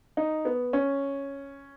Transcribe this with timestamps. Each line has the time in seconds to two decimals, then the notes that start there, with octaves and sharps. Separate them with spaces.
0.17 D#4
0.45 B3
0.73 C#4